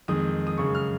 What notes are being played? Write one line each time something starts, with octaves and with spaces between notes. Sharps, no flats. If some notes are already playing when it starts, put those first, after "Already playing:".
F2 D#3 G#3 D#6
D#6
F#2 C#3 G#3 C#6
F6